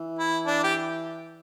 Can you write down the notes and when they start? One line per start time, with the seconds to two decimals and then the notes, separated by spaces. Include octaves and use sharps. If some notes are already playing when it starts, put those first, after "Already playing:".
Already playing: E3
0.19 E4
0.46 D4
0.64 G4